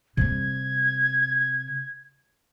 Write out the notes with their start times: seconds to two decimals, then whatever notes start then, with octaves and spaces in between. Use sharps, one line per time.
0.17 C3 G3 G#6